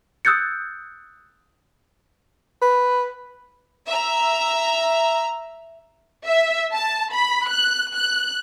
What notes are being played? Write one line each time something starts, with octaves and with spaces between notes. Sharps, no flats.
D#6 E6 F#6 G6 A6 C#7
B4
E5 A#5
E5
A5
B5
F#6
F#6